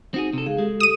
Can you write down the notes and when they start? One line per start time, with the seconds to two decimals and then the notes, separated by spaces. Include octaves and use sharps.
0.14 C4 D#4 F#4 G#4
0.33 C3 A4
0.46 C#2 G#4 F5
0.58 G#3 G4 A4
0.80 D#6 D#7